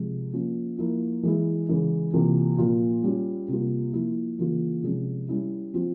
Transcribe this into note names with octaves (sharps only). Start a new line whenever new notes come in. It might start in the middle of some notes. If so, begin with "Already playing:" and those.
Already playing: C3 F3 G#3
F3 A#3 C#4 F4
F3 A#3 E4
E3 G#3 E4
C#3 E3 G#3
C3 E3 A#3 F4
A#2 F3 A#3 F4
G3 C#4 F4
C3 G3 A#3 F4
F3 A#3 E4
C#3 E3 A#3 F4
C3 F3 G#3 C#4
G3 C#4 E4
F3 C4 F4